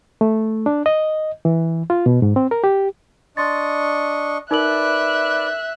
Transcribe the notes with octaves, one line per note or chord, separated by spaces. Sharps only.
A3
D4
D#5
E3
F4
B2
G#2
C4
A#4
G4
D4 D#5 C6 C#6 A6
D#4 A#4 B4 D5 E5 F#6 F#7